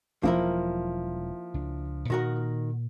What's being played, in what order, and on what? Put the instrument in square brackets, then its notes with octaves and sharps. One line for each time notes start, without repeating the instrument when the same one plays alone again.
[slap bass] E1 F#3 [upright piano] F3 [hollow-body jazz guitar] A#3 E4 A#4
[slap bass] C#2 D4
[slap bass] A#2 [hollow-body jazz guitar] D#3 F#4 A#4